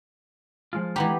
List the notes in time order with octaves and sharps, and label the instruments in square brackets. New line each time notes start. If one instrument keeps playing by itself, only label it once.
[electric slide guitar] F3 G#3 F4
[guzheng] E3 B3 G4 [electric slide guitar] G#3 A#5